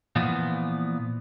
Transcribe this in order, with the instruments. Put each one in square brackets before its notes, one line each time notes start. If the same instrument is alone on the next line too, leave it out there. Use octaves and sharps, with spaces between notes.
[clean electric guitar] A#2 E3 F3 B3